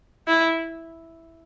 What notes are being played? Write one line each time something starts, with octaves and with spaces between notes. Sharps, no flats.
E4